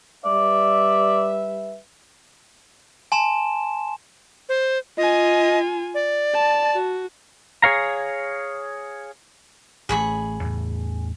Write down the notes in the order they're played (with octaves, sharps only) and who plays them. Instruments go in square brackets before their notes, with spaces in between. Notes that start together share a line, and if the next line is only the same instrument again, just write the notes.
[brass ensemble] G3 B4 E5 [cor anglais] D5
[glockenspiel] G#5 A5 C6 E7
[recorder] C5
[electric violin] F4 G#5 [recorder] D#5
[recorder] D5
[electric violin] A5
F#4
[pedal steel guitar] G#4 C#5 F5 A#5
[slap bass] A1 A3 [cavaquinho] G#4 B5 C#6
[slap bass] E2 A2